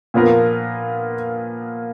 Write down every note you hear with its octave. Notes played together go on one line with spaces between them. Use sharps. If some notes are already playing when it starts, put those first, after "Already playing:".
A#2 F3 B3 F4 A#4